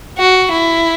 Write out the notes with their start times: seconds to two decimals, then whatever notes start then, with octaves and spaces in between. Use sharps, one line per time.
0.18 F#4
0.51 E4